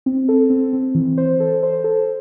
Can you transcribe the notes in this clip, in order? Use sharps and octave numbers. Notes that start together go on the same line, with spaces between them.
C4
A4
C4
C4
E3
C5
A4
C5
A4